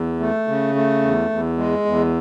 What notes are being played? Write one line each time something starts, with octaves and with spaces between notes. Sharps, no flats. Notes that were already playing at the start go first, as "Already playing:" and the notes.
Already playing: E2
A3
C#3
A3
E2
E2
G#3
E2